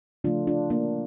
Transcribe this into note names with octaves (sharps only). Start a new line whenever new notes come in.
C#3 F3 A3 D4 F4
D4 F4
A#3 D4